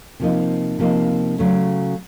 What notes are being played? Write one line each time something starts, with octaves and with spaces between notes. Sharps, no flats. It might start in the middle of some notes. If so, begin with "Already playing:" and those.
C3 F3 A#3 D#4
C3 F3 A#3 D#4
C#3 F#3 A3 C#4